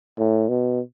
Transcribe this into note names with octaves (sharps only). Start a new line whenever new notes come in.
A2
B2